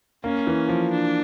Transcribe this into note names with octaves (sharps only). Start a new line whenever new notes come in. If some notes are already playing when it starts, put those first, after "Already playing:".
A#3 C#4
E3
F3
D4